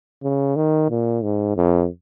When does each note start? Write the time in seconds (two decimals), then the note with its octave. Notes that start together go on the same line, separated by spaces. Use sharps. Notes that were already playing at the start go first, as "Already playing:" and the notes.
0.23 C#3
0.56 D#3
0.90 A#2
1.23 G#2
1.57 F2